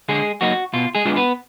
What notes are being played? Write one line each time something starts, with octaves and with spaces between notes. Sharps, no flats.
D3 G#3 G#4
F#3 A#3 D#4 F#4
B2 F4
G#3 G#4
G#3 B3 D4 F4
B3 B4